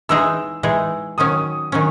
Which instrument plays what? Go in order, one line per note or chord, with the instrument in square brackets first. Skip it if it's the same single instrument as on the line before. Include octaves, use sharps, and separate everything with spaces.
[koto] E3 G#3 D#4 G#4 [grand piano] E6
[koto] E3 G#3 D#4 G#4
[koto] D#3 F#3 C#4 [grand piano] D#6
[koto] D#3 F#3 C#4